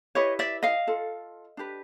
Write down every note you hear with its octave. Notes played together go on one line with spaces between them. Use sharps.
E4 G4 B4 C#5 D#5
D5 E5
D#5 F5
F4 A4
D4 G4 B4